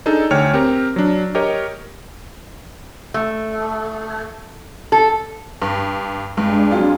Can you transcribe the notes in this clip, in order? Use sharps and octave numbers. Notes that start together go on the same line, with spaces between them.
D4 D#4 G#4 A4
D2 C#5 G5 F6
C4 G4 A#4
F#3 D4
G4 A#4 C#5 D#5
A3
A4
G2
G2 G#3 D4
F2 F#3 F4